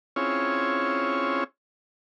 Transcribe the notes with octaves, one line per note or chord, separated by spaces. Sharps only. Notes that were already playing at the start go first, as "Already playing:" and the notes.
C4 C#4 E4 F4 G#4 C#5